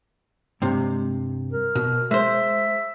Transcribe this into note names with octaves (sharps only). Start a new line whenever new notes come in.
G2 C3 G#3
A#4
B2
G#3 C5 E5